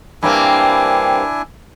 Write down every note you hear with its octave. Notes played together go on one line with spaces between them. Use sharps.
G2 A#3 C4 D4 E4 G#5